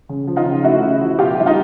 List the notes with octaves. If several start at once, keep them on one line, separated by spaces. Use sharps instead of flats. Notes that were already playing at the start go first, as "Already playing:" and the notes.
C#3
F3
D#4 F4
C#3
A3 E4 F#4
C#3
F3
B2 F4 G4
G3 E4
D#4 F4